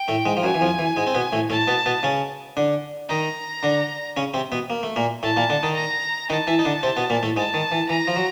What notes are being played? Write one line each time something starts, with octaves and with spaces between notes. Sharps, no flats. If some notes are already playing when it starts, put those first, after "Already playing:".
Already playing: G5
A2 A3
G#2 G#3
F3
F#2 F#3 G#5
E3
F2 F3
E3
G#2 G#3
C4
B2 B3
A2 A3
A2 A3 A5
B2 B3
B2 B3
C#3 C#4
D3 D4
D#3 D#4 A#5
D3 D4
C#3 C#4
C3 C4
B2 B3
A#3
A3
A#2 A#3
A2 A3 A5
A#2 A#3
D3 D4
D#3 D#4
A#5
D#3 D#4 A5
E3 E4
D#4
D3 D4
C3 C4
B2 B3
A#2 A#3
A2 A3
G#2 G#3 A5
D#3
E3
E3 A#5
F3
F#3